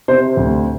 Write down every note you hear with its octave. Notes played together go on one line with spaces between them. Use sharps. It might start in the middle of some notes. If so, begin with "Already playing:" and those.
C3 C5
D2